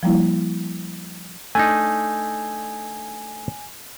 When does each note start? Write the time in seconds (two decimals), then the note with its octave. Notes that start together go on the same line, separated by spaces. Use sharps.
0.03 F3 G3 A#3 E4
1.55 A3 D4 D#4 G#5